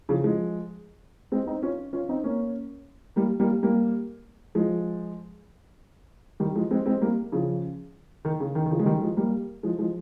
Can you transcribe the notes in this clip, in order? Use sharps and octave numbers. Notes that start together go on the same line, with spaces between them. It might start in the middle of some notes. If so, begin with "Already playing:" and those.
C#3 F3
F3 G#3
G#3 C4
C4 D#4
C#4 F4
C#4 F4
C4 D#4
A#3 C#4
G3 A#3
G3 A#3
G3 A#3
F3 G#3
D#3 G3
F3 G#3
G#3 C4
G#3 C4
G3 A#3
C#3 F3
D#3
C#3
D#3
D#3
C#3 F3
G#3
D#3 G3
F3 G#3
G3 A#3
F3 G#3
F3 G#3